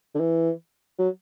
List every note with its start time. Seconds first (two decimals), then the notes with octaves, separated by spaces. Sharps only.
0.14 D3
0.20 E3
0.99 F#3